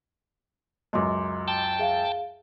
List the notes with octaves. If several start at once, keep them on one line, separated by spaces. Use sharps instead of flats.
C#2 F#2 D#5 C6 D6
G5 A5
G#4 E5 F5